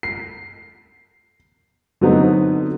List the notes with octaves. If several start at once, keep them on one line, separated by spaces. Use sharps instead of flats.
C7
D3 F#3 B3 C4 D#4